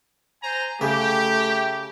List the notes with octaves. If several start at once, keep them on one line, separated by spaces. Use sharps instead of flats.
C5 G#5 A#5
C#3 A3 G4